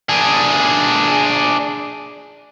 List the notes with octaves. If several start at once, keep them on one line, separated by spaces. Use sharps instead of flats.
D4 G#4